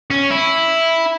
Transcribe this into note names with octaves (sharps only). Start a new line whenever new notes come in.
C#4
E4